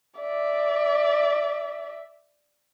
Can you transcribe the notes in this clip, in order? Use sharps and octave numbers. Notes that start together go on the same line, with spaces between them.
D5 E5